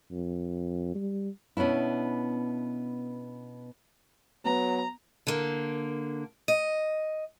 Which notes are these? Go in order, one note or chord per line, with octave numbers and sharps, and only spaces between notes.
F2
G3
B2 B3 C#4 D4 E4
F#3 B3 A#5
D3 A#3
D#5